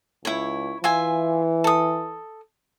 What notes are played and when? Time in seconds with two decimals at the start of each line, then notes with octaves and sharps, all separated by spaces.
0.25 C#2 E4 C#5
0.84 E3 F4 E5 G#5
1.64 A4 D#6